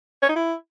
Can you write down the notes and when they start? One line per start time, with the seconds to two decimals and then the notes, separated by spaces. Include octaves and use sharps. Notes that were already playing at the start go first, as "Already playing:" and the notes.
0.22 C#5
0.29 D#4
0.36 E4